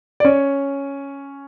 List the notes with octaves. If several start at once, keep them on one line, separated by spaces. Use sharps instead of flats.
D5
C#4 C#5